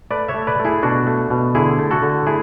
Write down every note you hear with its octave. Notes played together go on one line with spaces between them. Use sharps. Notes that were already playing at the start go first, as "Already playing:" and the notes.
A3 B4 D5
C#5 E5
A3
B4 D5
A3
E4 G#4
B2 D4 F#4
A3
B2
D3 E4 G#4
A3
F#4 A4
D3
A3 E4 G#4